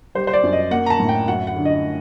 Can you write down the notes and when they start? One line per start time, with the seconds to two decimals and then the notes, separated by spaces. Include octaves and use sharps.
0.15 G3 C5
0.27 C5
0.33 D5
0.43 F#2
0.53 D#5
0.71 A#3 F#5
0.86 A#5
0.90 A5
1.00 A2
1.09 G5
1.28 F#2 F#5
1.47 F#5
1.56 D3
1.65 D#5